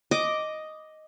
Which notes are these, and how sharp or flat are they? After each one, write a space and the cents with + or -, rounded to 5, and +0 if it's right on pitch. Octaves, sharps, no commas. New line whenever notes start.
D#5 +0 D6 +0